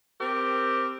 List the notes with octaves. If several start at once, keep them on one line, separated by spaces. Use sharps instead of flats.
C4 G4 A#4 C5